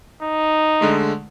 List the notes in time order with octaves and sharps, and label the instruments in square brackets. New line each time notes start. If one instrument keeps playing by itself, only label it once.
[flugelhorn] D#4
[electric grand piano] D3 G#3 A3